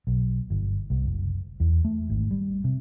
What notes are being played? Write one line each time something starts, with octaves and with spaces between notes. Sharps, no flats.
B1
G1
C2
F#1
E2
A3
G#1
G3
C3